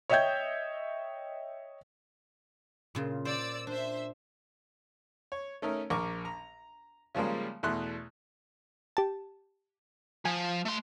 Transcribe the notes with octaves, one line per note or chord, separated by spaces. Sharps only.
C#5 D#5 E5 G5 G6 G#6
A#2 C#3 F4
C5 D5 E6
D4 C5 E5
C#5
A3 C#4 D#4 A#4
A#1 A#4 C#6 D6
A#5
C#3 F3 G3 G#3 A#3
E2 B2 A3 C6 F#6
G4 A5
F3 G#5
A3 C6